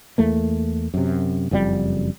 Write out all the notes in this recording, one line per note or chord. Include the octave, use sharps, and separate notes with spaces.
E2 A3 A#3
F#2 C3
F#1 F2 B2 G3